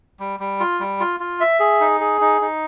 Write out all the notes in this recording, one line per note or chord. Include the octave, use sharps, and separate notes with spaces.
G3
G3
F4
G3
F4
F4
E5
G#4
D#4
G#4
D#4
D#4